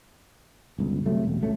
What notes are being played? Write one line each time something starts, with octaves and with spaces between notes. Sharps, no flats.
G1 C#2
C3 F#3 A3
E1
C#2 A3 C#4